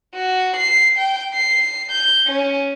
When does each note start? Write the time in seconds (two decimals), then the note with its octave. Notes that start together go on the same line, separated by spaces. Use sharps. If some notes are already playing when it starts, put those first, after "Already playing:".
0.15 F#4
0.56 C7
0.98 G5
1.34 C7
1.91 G6
2.27 C#4